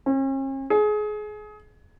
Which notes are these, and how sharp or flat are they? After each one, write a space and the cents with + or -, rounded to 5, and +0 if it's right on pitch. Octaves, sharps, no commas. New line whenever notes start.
C#4 -45
G#4 +25